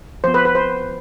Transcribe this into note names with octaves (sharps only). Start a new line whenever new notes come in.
F3 B3 C5
B4
B4
C5